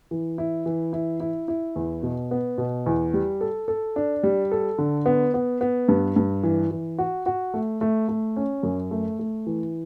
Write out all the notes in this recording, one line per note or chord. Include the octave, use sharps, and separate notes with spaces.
E3
E4
E3
E4
E4
E4
E2
B2
B3
B2
E2
G3
A4
A4
D4
G3
A4
D3
B3
B3
B3
G2
G2
E3
E3
F#4
F#4
A3
A3
A3
C#4
F#2
A3
A3
E3